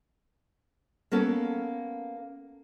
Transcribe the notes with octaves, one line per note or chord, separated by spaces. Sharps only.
A#3 B3 C#4 A4